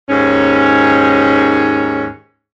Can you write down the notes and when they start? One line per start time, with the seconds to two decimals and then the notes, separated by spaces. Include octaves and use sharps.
0.08 D#2 G#2 C#4